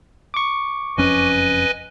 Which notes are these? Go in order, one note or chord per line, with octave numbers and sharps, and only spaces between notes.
C#6 D6
F#1 F2 C#4 B4 D#5 G#5